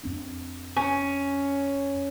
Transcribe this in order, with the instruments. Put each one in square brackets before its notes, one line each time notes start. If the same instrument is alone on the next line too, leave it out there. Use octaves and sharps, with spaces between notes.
[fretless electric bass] F2 C4 D4
[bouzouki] C#4